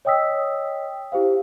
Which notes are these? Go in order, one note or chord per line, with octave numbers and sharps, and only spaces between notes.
C#5 D#5 G5 D#6 E6 B6
E4 G4 C5 F5